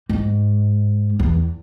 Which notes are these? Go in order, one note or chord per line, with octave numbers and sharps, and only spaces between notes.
G#2
E2